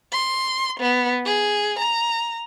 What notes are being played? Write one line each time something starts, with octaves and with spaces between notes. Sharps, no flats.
C6
B3
G#4
A#5